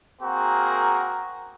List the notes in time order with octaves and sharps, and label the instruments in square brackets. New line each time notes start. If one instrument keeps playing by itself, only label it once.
[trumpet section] A#3 C4 F#4 G#4 A#4